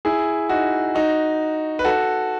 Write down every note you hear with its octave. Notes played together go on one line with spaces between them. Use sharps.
E4 G#4
D#4 F#4
D#4 F#4
B4
F#4 A4